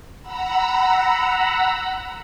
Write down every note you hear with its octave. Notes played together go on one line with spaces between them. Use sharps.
F#5 A#5 B5 E6